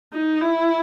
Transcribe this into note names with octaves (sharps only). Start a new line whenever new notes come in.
D#4
E4